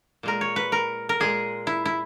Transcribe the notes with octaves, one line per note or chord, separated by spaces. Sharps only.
A#2 G#3 A#4
C#5
B4
A#4
A#4
A#2 G#3 G#4
E4
E4